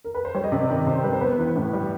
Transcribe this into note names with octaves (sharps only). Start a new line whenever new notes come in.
A#4
B4
C5
G3 C#5
D#5
C3 D5
D#3 D#5
C3 C5
G3 B4
C5
B3 B4
E3
A2
G3